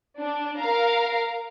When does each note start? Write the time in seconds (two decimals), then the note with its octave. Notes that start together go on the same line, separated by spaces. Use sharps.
0.17 D4
0.59 A#4 F5 A#5